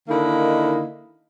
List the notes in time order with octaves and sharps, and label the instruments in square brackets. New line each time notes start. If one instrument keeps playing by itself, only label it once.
[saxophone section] D3 D#3 A#3 D#4 E4